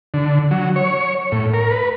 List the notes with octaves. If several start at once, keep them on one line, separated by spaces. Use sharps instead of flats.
D3
F#3
C#5
A2
A#4
B4